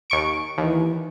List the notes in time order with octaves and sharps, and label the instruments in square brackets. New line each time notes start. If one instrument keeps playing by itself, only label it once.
[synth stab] D#2 C#6 D7
[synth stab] D#2 [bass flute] E3